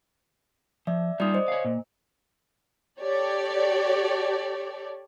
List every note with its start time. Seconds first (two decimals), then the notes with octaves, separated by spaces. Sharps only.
0.87 F3 D5 E5
1.20 G3 D#4 F4 D5 D#6
1.34 C5 D#5
1.48 C#5 F5
1.65 A#2
3.01 G4 A4 C#5 D5